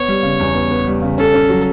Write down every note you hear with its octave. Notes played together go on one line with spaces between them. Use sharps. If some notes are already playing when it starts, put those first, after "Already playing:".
Already playing: B3 C#5
G3
C#3
E2
B3
B3
G3
C#3
C#4 A4
C#4
F#3